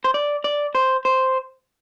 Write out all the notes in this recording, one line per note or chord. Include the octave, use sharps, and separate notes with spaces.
C5
D5
D5
C5
C5